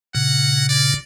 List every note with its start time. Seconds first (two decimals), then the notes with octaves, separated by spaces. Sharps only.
0.15 A#2 C#3 F#5
0.69 D5